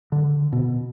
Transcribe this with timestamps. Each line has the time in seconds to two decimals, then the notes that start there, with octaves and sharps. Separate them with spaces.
0.12 D3
0.53 B2